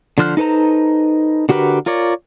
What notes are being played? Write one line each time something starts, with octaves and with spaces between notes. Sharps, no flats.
D3 F3 C5 F6 F#6
D#4 A4 B4 C5 A#5
D3 F#4 G4 A#4 B4
F4 A#4 C#5 D5